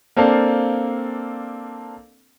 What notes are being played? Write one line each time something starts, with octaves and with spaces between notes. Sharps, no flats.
A#3 C4 D4 A4 F5